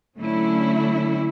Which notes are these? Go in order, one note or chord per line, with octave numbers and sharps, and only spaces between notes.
D3 F#3 A3 C#4 E4